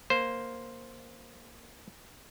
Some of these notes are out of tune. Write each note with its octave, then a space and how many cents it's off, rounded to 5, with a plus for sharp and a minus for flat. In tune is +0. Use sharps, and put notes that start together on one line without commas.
A#3 +5 C5 +0